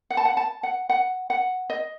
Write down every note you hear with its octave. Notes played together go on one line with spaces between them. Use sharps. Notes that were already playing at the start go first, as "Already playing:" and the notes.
F#5
A5
F#5
A5
F#5
F#5
F#5
D#5